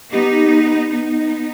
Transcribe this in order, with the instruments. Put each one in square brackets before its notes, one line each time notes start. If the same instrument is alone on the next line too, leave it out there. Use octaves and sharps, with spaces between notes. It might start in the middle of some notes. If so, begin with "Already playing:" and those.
[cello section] B3 D#4 [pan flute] G4
[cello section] B3 D#4